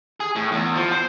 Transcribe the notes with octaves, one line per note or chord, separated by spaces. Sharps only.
G#4
A2
E2
F3
C5